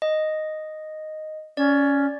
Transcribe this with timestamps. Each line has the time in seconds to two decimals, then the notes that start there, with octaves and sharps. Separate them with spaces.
0.02 D#5
1.57 C#4 D5